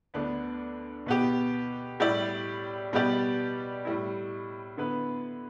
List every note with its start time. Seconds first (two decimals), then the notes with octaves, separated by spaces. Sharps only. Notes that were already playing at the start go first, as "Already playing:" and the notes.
0.14 D2 D3 B3 D4
1.06 B2 B3 G4
2.00 A2 G3 E4 G4 D5
2.93 B2 G3 B3 G4 D5
3.85 A2 G3 E4
4.77 D3 B3 E4 B4